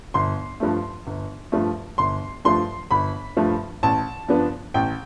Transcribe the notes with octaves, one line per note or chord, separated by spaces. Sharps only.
G1 C6
G2 F3 A3
G1
G2 F3 A3
G1 C6
G2 F3 A3 C6
G1 B5
G2 F3 A3
A1 A5
G2 F3 B3 D4
A1 G5